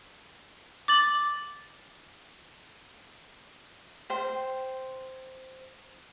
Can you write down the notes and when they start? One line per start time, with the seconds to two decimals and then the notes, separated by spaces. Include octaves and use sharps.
0.88 D6 A6 F#7
4.10 C5 G5